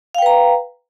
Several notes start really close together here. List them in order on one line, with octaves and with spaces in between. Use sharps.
F5 G5 B4 A#5